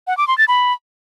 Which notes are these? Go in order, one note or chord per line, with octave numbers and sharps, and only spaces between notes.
F#5
D6
C6
A6
B5